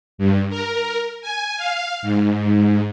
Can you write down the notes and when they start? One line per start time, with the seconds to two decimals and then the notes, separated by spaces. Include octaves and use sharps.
0.18 G2
0.50 A#4
1.22 G#5
1.57 F5
2.02 G#2